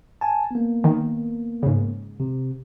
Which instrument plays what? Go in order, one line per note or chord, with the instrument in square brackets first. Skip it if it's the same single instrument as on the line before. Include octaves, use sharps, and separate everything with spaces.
[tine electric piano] G#5 A5
A#3 B3
[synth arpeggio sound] D#3
G#2 C#3
[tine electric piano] C3